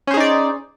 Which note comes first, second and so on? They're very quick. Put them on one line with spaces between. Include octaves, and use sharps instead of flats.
C#4 C5 G#4 D#4 D5